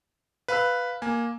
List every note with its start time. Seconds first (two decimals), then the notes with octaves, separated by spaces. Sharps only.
0.48 B4 F5 B5 E6
1.02 A#3 G#5